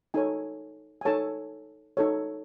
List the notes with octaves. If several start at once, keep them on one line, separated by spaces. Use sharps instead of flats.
D#4 A4 C#5 G#5
G#5
D#4 A4 C#5 A5
D#4 A4 C#5